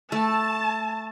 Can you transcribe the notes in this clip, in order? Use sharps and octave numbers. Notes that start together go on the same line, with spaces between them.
A3 A5